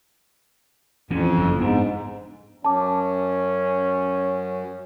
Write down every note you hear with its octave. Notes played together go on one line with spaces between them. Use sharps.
F2 E3 C#4
F#1 F#2 E3
G#2 B3 D4
F#2 C#4 A5 D6